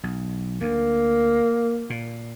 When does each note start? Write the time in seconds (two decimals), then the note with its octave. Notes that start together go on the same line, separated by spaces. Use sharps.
0.03 B1
0.60 D2 A#3
1.90 A#2